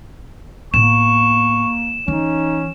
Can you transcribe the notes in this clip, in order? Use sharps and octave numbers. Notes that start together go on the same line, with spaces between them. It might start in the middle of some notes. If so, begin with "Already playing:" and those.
A2 A#3 B3 C#6 E7
E3 C#4 D#4